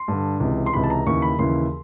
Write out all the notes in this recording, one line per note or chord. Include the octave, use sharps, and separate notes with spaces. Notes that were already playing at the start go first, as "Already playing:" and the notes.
Already playing: C6
G2 D3
C#2 C3 E3
C6
C#2 C3 E3 B5
A5
A#5
D#2 C#3 E3 C#6
B5
D#2 C#3 E3 C6